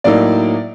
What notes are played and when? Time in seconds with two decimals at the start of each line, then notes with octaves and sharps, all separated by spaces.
0.04 A2 F#3 A#3 D#4 D5